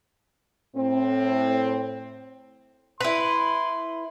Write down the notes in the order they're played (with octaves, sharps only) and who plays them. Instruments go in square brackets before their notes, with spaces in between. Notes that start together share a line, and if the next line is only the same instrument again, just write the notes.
[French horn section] A2 C4
[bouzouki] E4 B4 [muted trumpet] C6